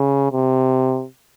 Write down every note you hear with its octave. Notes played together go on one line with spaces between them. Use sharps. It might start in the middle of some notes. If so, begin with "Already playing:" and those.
Already playing: C#3
C3